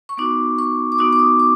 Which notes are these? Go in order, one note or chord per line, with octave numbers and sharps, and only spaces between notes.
C#6
B3 D#4 F#4 D6
C#6
D6
B3 D#4 F#4 D#6
D6
D#6
D6